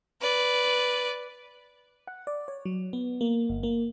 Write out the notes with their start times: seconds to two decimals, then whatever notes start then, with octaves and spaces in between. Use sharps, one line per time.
0.21 B4 D5
2.07 F#5
2.27 D5
2.48 C#5
2.65 F#3
2.93 B3
3.21 A#3
3.49 G1
3.63 A#3